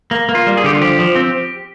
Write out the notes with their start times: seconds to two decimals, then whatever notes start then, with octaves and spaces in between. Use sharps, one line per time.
0.11 A#3
0.29 A#3
0.35 F4
0.47 G3
0.57 G#4
0.64 D3 G4
0.73 F4
0.81 F3 G4
0.99 F3
1.15 C4